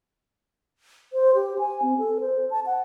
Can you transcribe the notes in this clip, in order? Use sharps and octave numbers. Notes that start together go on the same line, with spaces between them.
C5
G4
G#5
C4
A4
C5
A5
F#5